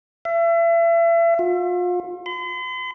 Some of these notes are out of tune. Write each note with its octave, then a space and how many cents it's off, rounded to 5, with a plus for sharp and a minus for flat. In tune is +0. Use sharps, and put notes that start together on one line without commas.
E5 +35
F4 +35
C6 -45